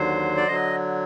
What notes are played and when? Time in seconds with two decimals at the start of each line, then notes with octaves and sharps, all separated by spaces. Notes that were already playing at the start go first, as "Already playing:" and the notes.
Already playing: D#2 D3 F#3 C5
0.37 D5
0.48 D3 F#3 D#5